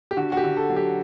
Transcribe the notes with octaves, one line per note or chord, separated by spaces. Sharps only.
G4
D3 F#4
F#4
G4
D3
A4
F#3
G4